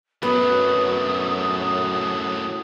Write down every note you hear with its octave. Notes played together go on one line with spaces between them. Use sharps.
F#2 A2 F#3 B3 D#6